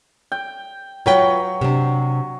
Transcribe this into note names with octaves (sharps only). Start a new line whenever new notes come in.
G5
F#3 F4 B4 G5
C3 D4